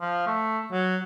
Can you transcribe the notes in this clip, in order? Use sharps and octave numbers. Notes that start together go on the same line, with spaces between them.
F3
A3
F#3